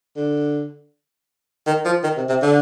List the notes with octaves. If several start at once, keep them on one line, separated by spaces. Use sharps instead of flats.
D3
D#3
F3
D#3
C3
C3
D3